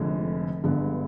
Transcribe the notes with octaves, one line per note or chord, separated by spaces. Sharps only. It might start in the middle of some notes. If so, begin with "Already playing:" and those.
Already playing: F1 F2 D3 G#3
G1 G2 D3 G#3 B3